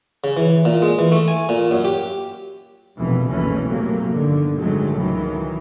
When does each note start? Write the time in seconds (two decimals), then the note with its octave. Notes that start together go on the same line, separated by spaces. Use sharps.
0.24 C#3
0.37 E3
0.65 A#2
0.82 G#3
0.99 E3
1.12 A3
1.28 G#5
1.49 A#2
1.71 F#2
1.85 G4
2.97 F1 A#1 F2 B2 E3
3.30 F#1 C2 B2 E3 A3 C#4
3.70 A2 C3 F#3 A3 A#3
4.14 G1 D3 D#3
4.59 D2 A2 D#3 F#3 G#3 A3
4.96 C#2 D#3 E3 F#3